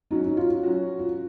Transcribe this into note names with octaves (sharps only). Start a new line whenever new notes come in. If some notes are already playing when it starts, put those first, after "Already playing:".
F#3 C#4 D#4 F#4
D#4
F4
F#3 C#4 F#4
F4